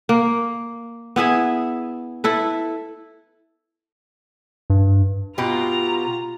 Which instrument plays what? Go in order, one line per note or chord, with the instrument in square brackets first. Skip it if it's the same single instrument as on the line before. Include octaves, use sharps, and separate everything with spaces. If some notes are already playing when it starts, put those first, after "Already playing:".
[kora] A#3
B3 E4 G#4 E5
E4 A4 B4
[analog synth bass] G2
[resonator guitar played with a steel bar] B2 G4 [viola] F4 A#5